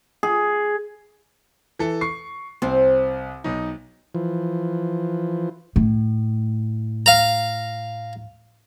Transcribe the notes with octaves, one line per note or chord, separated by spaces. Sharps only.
G#4
E3 A4
C#6 C7
C2 C4
B1 D#4
E3 F3
A2
F5 A#5